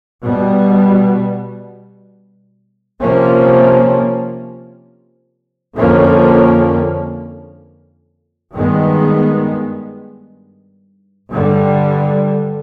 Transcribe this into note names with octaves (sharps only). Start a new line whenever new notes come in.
B2 G3 B3
C3 F3 A#3 C#4
F2 D3 F3 A#3 C#4
G2 D#3 G#3 B3
G2 D3 G3